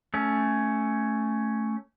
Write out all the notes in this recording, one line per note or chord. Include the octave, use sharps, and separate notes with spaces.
A3 C#4